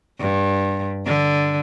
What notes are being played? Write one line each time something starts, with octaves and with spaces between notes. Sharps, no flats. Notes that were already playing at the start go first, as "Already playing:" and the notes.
G2
D3